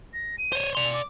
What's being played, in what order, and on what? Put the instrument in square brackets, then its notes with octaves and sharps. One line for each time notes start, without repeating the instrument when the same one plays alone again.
[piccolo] A#6
D#7
[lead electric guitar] C5 C#5
[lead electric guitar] D5 C6 [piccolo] F7
[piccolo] D6